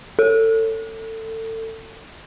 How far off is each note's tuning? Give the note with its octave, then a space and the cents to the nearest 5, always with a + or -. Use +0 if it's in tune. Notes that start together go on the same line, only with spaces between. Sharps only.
A4 +25